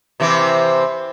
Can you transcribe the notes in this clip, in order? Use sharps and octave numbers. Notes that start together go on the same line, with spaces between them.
C3 E3 C4